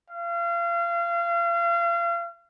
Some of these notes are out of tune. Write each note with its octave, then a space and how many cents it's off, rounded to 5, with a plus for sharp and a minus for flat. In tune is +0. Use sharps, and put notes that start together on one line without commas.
F5 -35